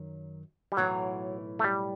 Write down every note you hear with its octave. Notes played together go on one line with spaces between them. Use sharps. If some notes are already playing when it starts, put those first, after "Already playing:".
Already playing: F#2 D#3 F#3
G3
B1 A2 E3 F#3
A3
G3